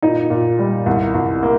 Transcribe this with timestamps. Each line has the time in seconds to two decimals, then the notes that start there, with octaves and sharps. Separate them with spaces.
0.02 A#2 D#4
0.30 A#2
0.59 G3
0.86 C2
1.14 C2
1.43 A#3